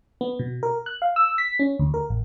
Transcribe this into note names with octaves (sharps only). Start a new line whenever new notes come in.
B3
B2
A#4
F#6
F5
E6
B6
C#4
D2
A#4
A1